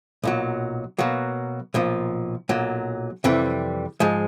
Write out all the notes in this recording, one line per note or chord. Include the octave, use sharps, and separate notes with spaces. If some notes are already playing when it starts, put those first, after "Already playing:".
B1 A#2 F#3
B2 F#3 A#3
B1 A#2 F3
B1 A#2 F#3
F2 C3 E3 G3
G#2 F3 G#3